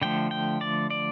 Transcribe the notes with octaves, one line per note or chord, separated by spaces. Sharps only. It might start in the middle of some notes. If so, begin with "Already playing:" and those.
D3 F3 A3 G5
G5
D5
D5